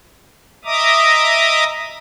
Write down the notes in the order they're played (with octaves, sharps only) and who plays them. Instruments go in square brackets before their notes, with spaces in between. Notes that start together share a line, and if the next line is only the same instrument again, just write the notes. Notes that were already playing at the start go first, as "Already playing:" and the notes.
[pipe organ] D#5 E5 A#5 D6 D#6